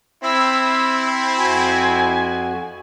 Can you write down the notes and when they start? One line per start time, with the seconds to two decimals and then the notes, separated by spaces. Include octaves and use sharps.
0.24 C4 E4 E6
1.37 F2 F#4 G#5